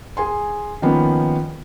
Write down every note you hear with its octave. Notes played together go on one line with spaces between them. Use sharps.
G#4 G#5 C6
D#3 F3 A#3 B3 C#4